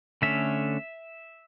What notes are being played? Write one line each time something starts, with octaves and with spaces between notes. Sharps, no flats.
D3 A3 C#4 E5